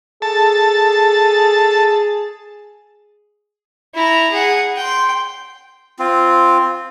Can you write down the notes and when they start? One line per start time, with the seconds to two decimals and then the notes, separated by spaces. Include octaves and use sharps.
0.22 G#4 A4 A5
3.95 E4 A#5
4.31 G#4 F#5
4.76 G5 C6
5.99 C4 F4